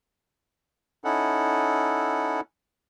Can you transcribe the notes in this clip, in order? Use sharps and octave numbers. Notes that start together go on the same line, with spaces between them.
C#4 D#4 E4 A4 F#5